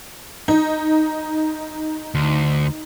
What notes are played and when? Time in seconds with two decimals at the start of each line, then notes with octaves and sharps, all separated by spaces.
0.48 D#4
2.15 D2